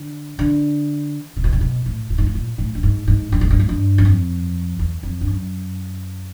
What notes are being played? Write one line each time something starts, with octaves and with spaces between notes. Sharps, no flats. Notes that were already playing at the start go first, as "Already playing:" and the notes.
Already playing: D3
D3
C3
B2
C3
B2
A2
A#2
G#2
A2
A#2
A2
G2
G#2
G#2
G2
G#2
G2
G#2
G2
F#2
F2
E2
F2
G2
F#2